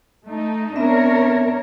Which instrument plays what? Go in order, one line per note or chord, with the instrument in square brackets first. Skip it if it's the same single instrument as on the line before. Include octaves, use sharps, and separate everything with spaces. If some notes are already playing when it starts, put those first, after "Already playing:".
[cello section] A3 D#4
[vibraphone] B3 C4 E5 [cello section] D4 A#4 C#5